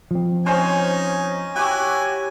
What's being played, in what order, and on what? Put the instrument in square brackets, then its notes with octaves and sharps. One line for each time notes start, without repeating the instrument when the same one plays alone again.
[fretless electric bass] F3 C4
[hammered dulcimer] C#4 C5 [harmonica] D#4 G#5
[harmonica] E4 G#5 [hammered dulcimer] F#4 G4